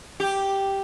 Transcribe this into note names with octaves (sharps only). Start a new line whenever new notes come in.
G4